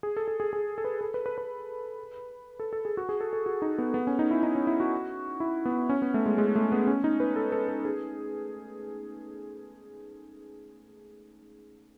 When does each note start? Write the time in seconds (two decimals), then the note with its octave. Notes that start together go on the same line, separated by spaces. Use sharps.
0.03 G#4
0.17 A4
0.28 A4
0.40 G#4
0.53 G#4
0.78 A4
0.85 B4
1.01 A4
1.14 B4
1.26 B4
1.38 B4
2.60 A4
2.73 A4
2.85 G#4
2.97 F#4
3.09 G#4
3.21 A4
3.33 A4
3.46 F#4
3.62 D#4
3.78 B3
3.94 B3
4.07 C#4
4.19 D#4
4.31 E4
4.43 D#4
4.55 C#4
4.67 E4
4.80 F#4
5.40 E4
5.65 B3
5.89 C#4
6.02 B3
6.14 A3
6.26 G#3
6.38 G#3
6.55 A3
6.72 B3
6.87 C#4
7.04 D#4
7.20 B4
7.36 A4
7.52 A4
7.68 A4
7.85 G#4